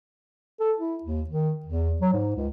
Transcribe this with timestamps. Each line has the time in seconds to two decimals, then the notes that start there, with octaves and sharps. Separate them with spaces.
0.60 A4
0.78 E4
1.03 D#2
1.30 D#3
1.65 E2
2.01 F#3
2.13 G#2
2.36 C#2